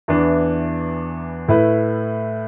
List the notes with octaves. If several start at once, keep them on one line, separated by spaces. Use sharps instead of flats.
E2 E3 B3 D4
A2 A3 E4 B4